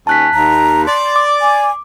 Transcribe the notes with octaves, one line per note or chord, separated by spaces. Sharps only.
D#2 C#4 A5 F#6 B6
D#2 A#5
D5 C6
D6
G#5